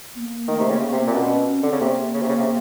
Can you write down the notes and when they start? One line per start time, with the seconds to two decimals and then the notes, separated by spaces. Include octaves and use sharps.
0.15 B3
0.19 A#3
0.48 D#3 A3
0.60 C3
0.70 C#3 A#3
0.92 C3 C4
1.07 A#2
1.14 B2 C#4
1.36 C#4
1.59 D3 C4
1.72 C#3
1.81 C3 A#3
2.14 C#3
2.22 C3
2.29 C#3
2.39 C3